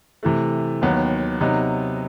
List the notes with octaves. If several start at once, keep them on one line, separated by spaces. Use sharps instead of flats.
C3 E3 A3
D#2 D#3 F#3 B3
C3 F#3 B3 D#4